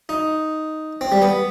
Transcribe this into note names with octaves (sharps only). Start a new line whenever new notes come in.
D#4
C4
G3
B3